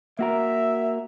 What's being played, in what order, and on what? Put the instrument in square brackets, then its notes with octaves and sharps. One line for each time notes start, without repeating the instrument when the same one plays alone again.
[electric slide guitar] A#3 F#4 A#4 [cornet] E5